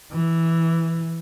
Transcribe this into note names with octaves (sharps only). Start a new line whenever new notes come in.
E3